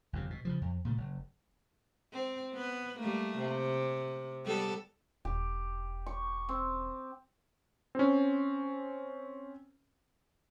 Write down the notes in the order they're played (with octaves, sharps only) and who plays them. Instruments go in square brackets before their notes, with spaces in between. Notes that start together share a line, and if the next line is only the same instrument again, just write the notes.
[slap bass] G1 F2 C3
B2
C#3 E3 F3
F2
A#2 C#3 E3 A3
F#1
[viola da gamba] C4
B3 B4
G3 A3 A#3
C3
G3 B3 A4
[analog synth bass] E1 [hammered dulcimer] G4
[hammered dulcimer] C#6
C4
[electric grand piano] C4 C#4